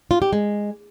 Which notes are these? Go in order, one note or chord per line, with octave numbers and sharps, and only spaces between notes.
F4
G4
G#3